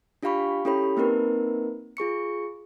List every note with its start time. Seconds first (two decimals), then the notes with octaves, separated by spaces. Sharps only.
0.23 D4 F4 G4 F5 B5 C#6
0.65 C#4 E4 G4 A4 C#5 B5
0.97 A#3 C4 D#4 A#4 B4
1.97 F4 G#4 C#6 C#7